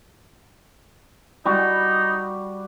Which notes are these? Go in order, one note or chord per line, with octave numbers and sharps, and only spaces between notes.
G3 D#4 F#4 G4